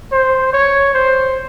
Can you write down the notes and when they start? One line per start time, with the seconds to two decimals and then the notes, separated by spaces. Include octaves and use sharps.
0.11 C5
0.53 C#5
0.94 C5